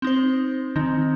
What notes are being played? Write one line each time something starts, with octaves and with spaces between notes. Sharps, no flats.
C4 D#4 C5
D#3 C4 D#4